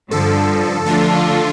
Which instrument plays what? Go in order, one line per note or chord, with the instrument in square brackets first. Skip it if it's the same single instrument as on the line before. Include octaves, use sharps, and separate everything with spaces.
[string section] G2 D3 F3 [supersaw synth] A4
[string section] D3 F3 A3 D4 F4 [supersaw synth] A4